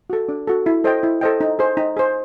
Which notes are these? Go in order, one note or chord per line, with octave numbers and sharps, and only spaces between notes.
F#4 A4
D4
F#4 A4
E4
A4 C5 D#5 G5
E4
A4 C5 D#5 G5
D#4
G#4 C5
D#4
G#4 C5